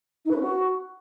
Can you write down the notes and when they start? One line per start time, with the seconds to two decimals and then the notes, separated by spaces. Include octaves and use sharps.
0.25 D#4
0.30 B4
0.35 C#4
0.41 F#4